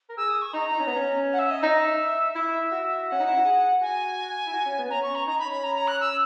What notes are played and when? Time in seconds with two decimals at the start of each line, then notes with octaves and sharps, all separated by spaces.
0.09 A#4
0.17 G#4 E6
0.30 D#6
0.41 C#6
0.53 D#4 A#5
0.72 D#4
0.79 C#4
0.87 B3
0.95 C#4
1.33 F#5
1.39 E5
1.50 D#5
1.63 D#4 E5
2.35 E4 E5
2.72 F#4
3.08 C#4 F#5
3.20 D#4
3.28 E4
3.37 F#4
3.44 G#4
3.81 F#4 G#5
4.47 E4
4.53 F#4
4.66 C#4
4.79 B3
4.90 C#4 A#5
5.03 C#6
5.15 A#5
5.27 D#4 A#5
5.39 B5
5.45 C#4
5.51 B5
5.63 A#5
5.75 A#5
5.87 F#6
6.00 E6